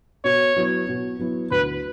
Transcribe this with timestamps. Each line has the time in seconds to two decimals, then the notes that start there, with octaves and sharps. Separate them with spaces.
0.24 B2 C#5
0.56 F#3 B3 E4
0.88 B2
1.19 F#3 B3 E4
1.51 D2 B4